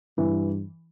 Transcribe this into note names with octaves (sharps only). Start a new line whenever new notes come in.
G2 E3